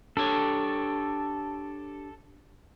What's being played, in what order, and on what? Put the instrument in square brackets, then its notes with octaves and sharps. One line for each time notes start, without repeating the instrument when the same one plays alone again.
[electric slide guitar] D4 G4 C#5 [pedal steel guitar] A4